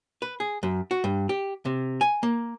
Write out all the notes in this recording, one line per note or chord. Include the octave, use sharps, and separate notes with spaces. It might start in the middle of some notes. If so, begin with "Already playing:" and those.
B4
G#4
F#2
F#4
G2
G4
C3
G#5
A#3